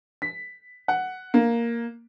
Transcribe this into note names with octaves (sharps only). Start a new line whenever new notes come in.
B6
F#5
A#3